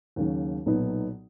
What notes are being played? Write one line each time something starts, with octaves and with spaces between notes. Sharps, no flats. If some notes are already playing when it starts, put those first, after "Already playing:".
D#2 C#3 F#3
B1 A#2 F#3 B3 D#4